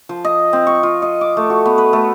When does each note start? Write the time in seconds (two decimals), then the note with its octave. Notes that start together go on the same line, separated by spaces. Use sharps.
0.09 F3
0.25 D#5
0.53 C4
0.67 C#6
0.83 F4
1.02 D#5
1.21 D6
1.37 A3
1.50 F#4
1.66 B3
1.78 B4
1.93 A3